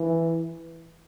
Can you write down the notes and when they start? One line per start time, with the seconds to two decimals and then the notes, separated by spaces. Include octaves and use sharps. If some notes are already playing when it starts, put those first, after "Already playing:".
Already playing: E3